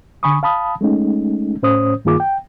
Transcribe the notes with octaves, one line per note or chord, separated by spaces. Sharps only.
D3 G#5 B5 C#6 D#6
F5 A5 B5 D#6
G#3 A3 C#4 D#4
A2 C#4 C5 C#5 D#6
G2 D#3 A#3 F4 G#4 D6
G5